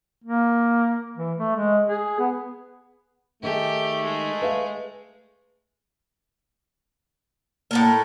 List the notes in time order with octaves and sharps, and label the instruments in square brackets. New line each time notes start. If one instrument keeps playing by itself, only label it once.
[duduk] A#3
E3
A3
G#3
G#4
B3
[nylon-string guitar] D#3 D#4 G#4 [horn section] A3 [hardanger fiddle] G4
[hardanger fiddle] G#3
[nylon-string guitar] B4 E5 F5
[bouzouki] A2 A4 A#4 [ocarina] A#3